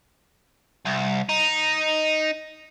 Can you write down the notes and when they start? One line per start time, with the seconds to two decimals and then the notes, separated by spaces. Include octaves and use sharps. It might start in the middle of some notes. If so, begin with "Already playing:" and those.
0.85 C2
1.29 D#4